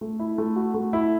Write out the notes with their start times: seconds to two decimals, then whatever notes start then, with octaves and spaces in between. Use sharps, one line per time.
0.01 A3
0.19 E4
0.38 A3
0.56 F#4
0.74 A3
0.93 E4